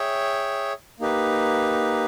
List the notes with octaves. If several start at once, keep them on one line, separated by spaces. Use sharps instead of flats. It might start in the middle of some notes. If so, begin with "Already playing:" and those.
Already playing: G#4 C#5 E5 G5
A#3 D#4 G4 B4